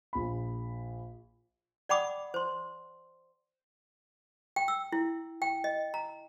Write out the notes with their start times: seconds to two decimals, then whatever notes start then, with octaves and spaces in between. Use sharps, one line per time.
0.13 A#1 B5
1.89 D5 F#5 G5 B5 D6 D#6
2.34 C5 C6
4.56 G5
4.68 E6
4.92 E4
5.42 G5
5.64 D#5
5.94 A#5